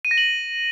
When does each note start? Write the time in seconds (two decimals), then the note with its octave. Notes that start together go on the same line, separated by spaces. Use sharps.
0.05 D#7
0.11 A#6
0.18 F#7